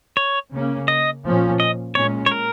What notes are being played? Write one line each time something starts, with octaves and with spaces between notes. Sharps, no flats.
C#5
C#3 A#3 C#4
D#5
A#2 F3 C#4
D#5
A#2 G#3 C#4 C#5
C#5
A#4